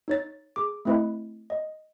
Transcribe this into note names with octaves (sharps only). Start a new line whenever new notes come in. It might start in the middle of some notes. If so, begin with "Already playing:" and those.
D#4 C#5 A6
G#4 D6
A3 C4 E4 B4 D#5 B5
D#5